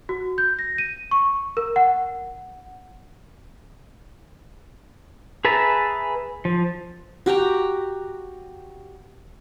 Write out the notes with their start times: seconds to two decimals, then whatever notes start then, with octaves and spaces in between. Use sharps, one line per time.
0.09 F#4
0.38 G6
0.59 A#6
0.78 D#7
1.11 C#6
1.57 A#4
1.76 F#5
5.45 G#4 B4 E5 A5 A#5
6.45 F3
7.26 F#4 G4 G5 A#5